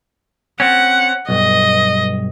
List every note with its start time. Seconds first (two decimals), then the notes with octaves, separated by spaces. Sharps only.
0.60 C4 C#4 F#5
1.29 B1 G2 D#5